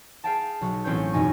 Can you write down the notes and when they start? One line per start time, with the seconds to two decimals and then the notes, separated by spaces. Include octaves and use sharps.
0.24 G#4 F5 G5 A5
0.61 B1 F#4
0.84 A1 C4 C#4 B4 C#5 G6
1.13 E1 F#2 B2 D#4 G#5 C#6